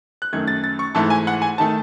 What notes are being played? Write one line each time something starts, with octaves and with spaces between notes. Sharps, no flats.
F#6
F#2 D#3 A3 G#6
A6
A6
C#6
G#2 E3 A3 A5
G#5
F#5
G#5
D#3 A3 A5